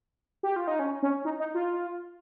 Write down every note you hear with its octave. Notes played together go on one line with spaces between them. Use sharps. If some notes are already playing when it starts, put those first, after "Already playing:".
G4
F4
D#4
C#4
C#4
D#4
D#4
F4